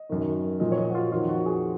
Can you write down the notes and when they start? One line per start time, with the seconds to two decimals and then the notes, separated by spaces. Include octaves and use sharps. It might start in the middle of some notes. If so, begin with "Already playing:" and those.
Already playing: D#5
0.10 F#2 D#3
0.60 A#2 F3 D#5
0.72 C#5
0.78 D#5
0.90 F#4
0.95 F4
1.12 F2 D#3 F4
1.29 F#4
1.46 G#4